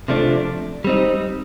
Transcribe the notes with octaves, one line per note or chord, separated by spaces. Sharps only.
C3 F3 A3 D4
G3 C4 D#4